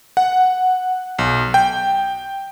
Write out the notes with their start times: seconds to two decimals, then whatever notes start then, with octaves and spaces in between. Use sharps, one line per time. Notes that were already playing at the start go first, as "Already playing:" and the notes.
0.17 F#5
1.19 B1
1.54 G5